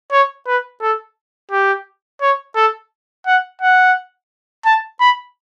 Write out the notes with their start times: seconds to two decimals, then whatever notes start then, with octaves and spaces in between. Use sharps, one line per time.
0.12 C#5
0.47 B4
0.81 A4
1.51 G4
2.21 C#5
2.56 A4
3.26 F#5
3.62 F#5
4.65 A5
5.00 B5